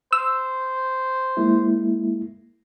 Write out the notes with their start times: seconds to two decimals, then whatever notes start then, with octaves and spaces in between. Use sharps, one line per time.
0.13 C5 E6
1.37 G#3 A#3 E4